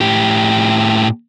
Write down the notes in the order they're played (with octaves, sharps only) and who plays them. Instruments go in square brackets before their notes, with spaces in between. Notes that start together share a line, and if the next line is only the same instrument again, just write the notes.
[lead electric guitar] A2 G4